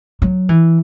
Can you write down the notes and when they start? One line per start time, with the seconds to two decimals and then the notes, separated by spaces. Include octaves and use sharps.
0.22 F#3
0.49 E3